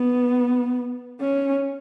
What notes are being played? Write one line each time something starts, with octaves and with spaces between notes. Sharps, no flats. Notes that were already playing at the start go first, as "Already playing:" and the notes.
Already playing: B3
C#4